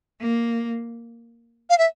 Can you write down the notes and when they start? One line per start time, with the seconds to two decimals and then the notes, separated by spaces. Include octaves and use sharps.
0.20 A#3
1.70 F5
1.78 E5